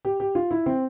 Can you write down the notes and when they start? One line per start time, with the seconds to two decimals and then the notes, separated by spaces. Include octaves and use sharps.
0.05 G4
0.20 G4
0.35 F4
0.51 E4
0.66 C4